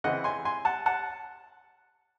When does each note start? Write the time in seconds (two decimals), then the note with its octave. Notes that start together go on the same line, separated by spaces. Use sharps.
0.04 C#3 E3 C4 D#5 F#5
0.24 G#5 C6
0.45 G#5 C6
0.65 F#5 A5
0.86 F#5 A5